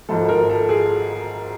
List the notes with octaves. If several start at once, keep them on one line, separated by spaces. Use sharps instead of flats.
G#1 G#2 F3 A4
A#4
A4
G#4